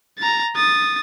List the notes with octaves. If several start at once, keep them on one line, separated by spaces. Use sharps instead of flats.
A#5 A6
D#6 A6